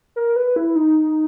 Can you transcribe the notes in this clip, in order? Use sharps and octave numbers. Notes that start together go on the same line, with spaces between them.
A#4
B4
E4
D#4